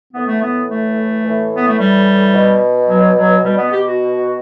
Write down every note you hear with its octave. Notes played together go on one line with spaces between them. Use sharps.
A2 E3 B3
A3
B3
A3
A2 E3
B3
A3
G3
B2
F#3
F#3
B2 G3
B3
G4
F#4